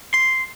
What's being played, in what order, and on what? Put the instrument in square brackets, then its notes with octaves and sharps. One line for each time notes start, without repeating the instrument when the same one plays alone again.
[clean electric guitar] C6